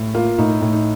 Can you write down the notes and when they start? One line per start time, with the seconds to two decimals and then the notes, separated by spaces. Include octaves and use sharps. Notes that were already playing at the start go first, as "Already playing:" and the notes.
Already playing: A2
0.14 A#3 F4
0.38 A2 D#4
0.61 A2
0.73 D#4